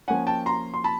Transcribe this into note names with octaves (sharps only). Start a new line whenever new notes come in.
F3 A#3 C#4 F#5 G#5
G5 A5
A#5 C6
C6
A5 B5